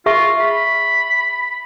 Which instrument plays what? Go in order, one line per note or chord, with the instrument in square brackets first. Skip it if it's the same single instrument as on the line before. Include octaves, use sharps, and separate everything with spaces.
[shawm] F4 [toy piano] G#4 E5 C#6
[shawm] B5